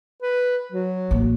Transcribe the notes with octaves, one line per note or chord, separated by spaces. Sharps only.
B4
F#3
A1 A#3